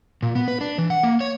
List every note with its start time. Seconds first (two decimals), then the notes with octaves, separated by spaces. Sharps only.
0.23 A#2
0.35 B3
0.48 B4
0.61 D4
0.78 E3
0.90 F#5
1.03 A#3
1.21 C#5